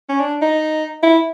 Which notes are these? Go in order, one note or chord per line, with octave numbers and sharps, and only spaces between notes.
C#4
D4
D#4
E4